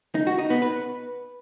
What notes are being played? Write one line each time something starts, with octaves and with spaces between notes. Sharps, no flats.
D#4
F#4
D#4
B3
B4